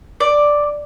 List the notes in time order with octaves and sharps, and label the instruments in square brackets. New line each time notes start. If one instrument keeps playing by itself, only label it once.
[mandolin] D5